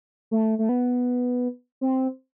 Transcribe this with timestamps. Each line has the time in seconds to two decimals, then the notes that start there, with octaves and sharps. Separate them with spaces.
0.31 A3
0.59 A3
0.69 B3
1.81 C4